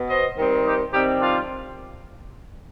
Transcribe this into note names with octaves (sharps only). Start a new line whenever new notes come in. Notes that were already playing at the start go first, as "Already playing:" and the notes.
Already playing: B2 B3
C5 D#5
D#3 G3 C4
D#4 G4
C3 D#3 G3 C4 D#4 G4
D4 F4